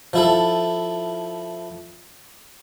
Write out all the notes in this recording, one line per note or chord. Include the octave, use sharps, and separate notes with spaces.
F3 E4 A4